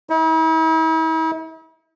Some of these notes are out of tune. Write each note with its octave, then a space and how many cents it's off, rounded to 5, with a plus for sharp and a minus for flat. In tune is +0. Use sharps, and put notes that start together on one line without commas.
E4 -45